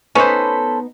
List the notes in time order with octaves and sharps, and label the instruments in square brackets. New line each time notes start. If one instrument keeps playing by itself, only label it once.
[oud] B3 D#4 [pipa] C#4 C5 [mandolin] A4 B5